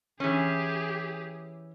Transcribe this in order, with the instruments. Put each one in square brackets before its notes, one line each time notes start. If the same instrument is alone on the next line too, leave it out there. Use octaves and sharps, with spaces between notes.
[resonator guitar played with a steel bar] E3 C#4 [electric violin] G4 G#4